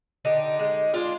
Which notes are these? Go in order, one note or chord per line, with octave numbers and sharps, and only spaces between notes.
D3 D#4 G4
G#3
G#3 D4 F4